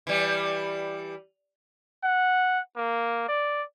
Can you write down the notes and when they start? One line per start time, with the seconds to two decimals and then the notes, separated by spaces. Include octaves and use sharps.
0.07 E3 G3
2.04 F#5
2.77 A#3
3.28 D5